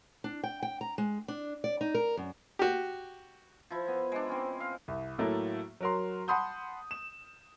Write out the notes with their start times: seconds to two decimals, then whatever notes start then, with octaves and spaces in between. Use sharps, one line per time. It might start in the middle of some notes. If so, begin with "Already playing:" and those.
0.24 D4
0.44 G5
0.63 G5
0.81 A#5
0.98 G#3
1.28 D4
1.64 D5
1.81 D#4
1.95 A#4
2.17 F#2
2.59 F#4 G4
3.70 F3 E4
3.88 B3
4.12 G#3 D4
4.29 C4 C#4
4.60 F5
4.88 C2
5.18 A2 F#3 A3 A#3
5.81 F#3 A#4 C6
6.28 F#5 A5 B5 C6 D#6 G6
6.91 E7